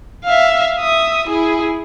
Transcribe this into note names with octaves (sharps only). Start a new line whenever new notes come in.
E5 F5
E5 D#6
E4 G#4